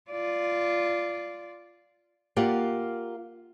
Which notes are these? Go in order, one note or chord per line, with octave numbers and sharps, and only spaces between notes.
F4 D5
A#3 F4 G4 D5 F5 F#5